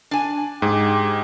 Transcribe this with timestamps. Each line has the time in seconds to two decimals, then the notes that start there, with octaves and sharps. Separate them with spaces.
0.11 D4 G#5
0.62 G#2 G4 G#4